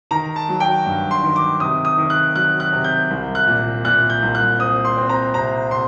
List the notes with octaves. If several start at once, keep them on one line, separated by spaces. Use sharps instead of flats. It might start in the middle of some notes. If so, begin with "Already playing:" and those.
D#3 A#5
A5
F#3
G5
G2
C6
D#3
D6
C3 D#6
D#6
D#3
F#6
F#3 F#6
F#6
C3
G6
C2
F#6
A#2
A#2 F#6
G6
C2
F#6
C4 D#6
C6
C4
A#5
C3 A#5
C3 C6